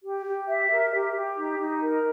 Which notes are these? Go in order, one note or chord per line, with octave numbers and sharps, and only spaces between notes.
G4
G4
E5
A#4
G4
G4
D#4
D#4
A#4